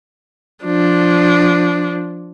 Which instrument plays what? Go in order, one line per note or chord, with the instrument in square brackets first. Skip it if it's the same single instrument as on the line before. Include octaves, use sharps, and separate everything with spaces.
[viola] F3 D4